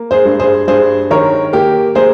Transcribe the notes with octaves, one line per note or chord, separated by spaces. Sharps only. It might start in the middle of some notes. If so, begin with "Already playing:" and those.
Already playing: A#3
G#4 C5
G2
G#4 C5
G2 G#4 C5
D#3 A#4 C#5
A#3 G4 A#4
A#3 G#4 C5